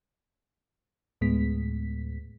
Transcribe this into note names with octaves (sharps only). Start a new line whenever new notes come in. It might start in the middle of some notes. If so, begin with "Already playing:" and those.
D2 A2 G#3 B3 B6